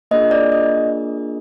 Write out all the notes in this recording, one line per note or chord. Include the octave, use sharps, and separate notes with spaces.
A#3 D4 F4 G#4 D#5
D5
D#5